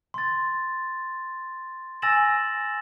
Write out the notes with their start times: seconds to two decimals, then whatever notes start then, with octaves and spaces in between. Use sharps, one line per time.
0.14 C6 A6
2.02 G#5 E6 A6 A#6 E7 F#7